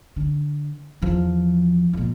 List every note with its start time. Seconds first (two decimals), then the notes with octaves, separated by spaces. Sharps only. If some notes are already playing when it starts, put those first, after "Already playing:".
0.16 D3
1.02 E2 F3
1.93 F2 A#2